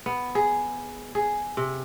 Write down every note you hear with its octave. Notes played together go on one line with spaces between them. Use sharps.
B3
G#4
G#4
C3